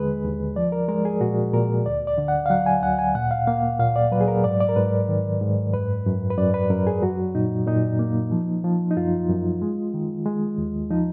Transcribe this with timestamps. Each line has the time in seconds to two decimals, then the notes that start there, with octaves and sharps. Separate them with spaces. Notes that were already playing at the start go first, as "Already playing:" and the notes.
Already playing: D#2 D3 G#3 G#4 B4
0.24 D#2
0.56 F3 D5
0.72 A#4
0.88 G#3 A#4
1.05 G#4
1.21 A#2 F#4
1.53 A#2 A#4
1.86 D2 D5
2.07 D5
2.18 D3
2.28 F#5
2.46 F5
2.50 F#3 F#5
2.66 G#5
2.83 D2 F#5
2.99 G#5
3.15 A#2 F#5
3.31 F5
3.47 A#3 F5
3.80 A#2 F5
3.96 D5
4.12 F#3 B4
4.21 G#4
4.28 A#4
4.44 G#2 D5
4.60 D5
4.69 A#4
4.76 G#2 B4
5.09 D#3
5.41 G#2
5.74 F#2 B4
6.06 F#2
6.30 B4
6.38 F#2 D5
6.54 B4
6.70 F#2 A#4
6.87 G#4
7.02 F#3 F#4
7.35 A#2 D#4
7.67 A#2 D#4
7.99 A#3
8.31 F3
8.64 F3
8.91 D#4
8.97 F#2 F4
9.29 F#2
9.62 G#3
9.94 D#3
10.26 G#3
10.58 D#2
10.90 F3 D#4